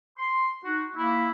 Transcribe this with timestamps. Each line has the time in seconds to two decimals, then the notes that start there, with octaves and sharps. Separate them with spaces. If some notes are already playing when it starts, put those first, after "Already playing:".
0.18 C6
0.64 D#4 F#4
0.97 A#3 E4